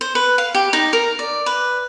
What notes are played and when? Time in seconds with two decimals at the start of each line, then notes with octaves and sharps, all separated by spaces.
0.01 C5
0.15 B4
0.38 F5
0.55 G4
0.73 D#4
0.93 A#4
1.19 D5
1.46 B4